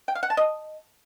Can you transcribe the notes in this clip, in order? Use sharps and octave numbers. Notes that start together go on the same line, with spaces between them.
G5
F5
F#5
A5
D#5